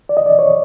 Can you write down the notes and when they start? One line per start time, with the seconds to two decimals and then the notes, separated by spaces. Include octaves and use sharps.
0.09 D5
0.17 D#5
0.26 D5
0.39 C#5